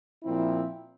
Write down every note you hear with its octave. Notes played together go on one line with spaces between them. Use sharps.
A#2 F3 C4 E4